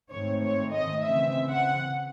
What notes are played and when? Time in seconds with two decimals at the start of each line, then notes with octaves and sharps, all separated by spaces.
0.10 G#2 D#3 A3 C4 C#5
0.41 C#5
0.72 D#5
1.03 C#3 E3 C4 E5
1.49 F#5